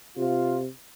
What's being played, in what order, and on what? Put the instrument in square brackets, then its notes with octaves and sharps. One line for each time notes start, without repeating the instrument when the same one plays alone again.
[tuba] C3 [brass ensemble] F4